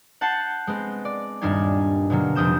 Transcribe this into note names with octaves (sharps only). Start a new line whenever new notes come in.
F#5 A5 G6 A6 C7 C#7
G#3 B3 C4
D5
D#1 G2 G3 D4 D#4 G#5
B2 D3 F#3 A#3
F1 C4 D#6 G6 E7